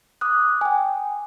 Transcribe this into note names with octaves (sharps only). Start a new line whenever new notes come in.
D6 D#6 F#6
G5 G#5